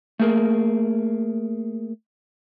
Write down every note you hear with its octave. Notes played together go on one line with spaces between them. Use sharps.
A3 A#3 G#4 A#4